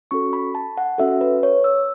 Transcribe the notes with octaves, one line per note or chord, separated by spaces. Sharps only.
C#4 F#4 A4 C#6
B5
A5
F#5
C#4 F#4 A4 E5
B4
C#5
E6